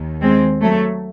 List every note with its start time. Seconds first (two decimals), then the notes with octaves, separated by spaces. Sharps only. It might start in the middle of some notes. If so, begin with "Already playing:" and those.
Already playing: D#2 D#3
0.21 G#3 C4
0.62 F#3 A3